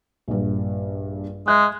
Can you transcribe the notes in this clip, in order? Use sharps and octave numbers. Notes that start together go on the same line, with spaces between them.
A#1 G2
G#3 E5 F#6